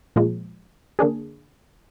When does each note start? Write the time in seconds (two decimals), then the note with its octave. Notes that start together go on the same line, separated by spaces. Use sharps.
0.16 A#2 F3 G#3
0.99 D3 A#3 D4 G#4